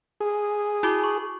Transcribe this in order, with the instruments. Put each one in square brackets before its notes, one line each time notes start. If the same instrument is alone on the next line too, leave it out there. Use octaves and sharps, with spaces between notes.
[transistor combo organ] G#4
[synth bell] E4 F#4 D6
C#6